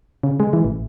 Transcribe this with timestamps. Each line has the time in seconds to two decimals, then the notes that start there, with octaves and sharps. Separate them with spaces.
0.23 C#3
0.40 G#3
0.53 E3
0.65 A1